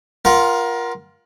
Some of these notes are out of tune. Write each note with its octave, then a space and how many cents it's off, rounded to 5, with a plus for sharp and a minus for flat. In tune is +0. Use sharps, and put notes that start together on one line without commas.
F4 +0 A#4 +25 F#5 +20